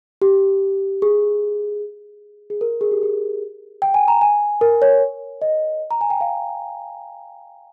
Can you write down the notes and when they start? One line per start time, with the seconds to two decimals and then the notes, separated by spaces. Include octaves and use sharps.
0.22 G4
1.02 G#4
2.50 G#4
2.61 A#4
2.81 G#4
2.92 G4
3.03 G#4
3.82 G5
3.94 G#5
4.08 A#5
4.21 G#5
4.61 A#4
4.82 C#5
5.42 D#5
5.91 A#5
6.01 G#5
6.10 G5
6.21 F5